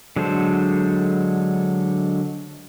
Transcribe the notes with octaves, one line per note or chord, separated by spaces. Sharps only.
D3 F#3 G#3 A4 C5